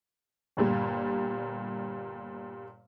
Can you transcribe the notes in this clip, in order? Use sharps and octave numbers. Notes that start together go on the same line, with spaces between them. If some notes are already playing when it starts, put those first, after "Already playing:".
G1 A#2 G3